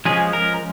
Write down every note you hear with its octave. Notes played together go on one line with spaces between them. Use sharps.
F3 G#3 C#4 G#4
A#4